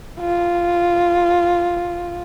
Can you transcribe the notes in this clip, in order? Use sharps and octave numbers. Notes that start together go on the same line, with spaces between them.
F4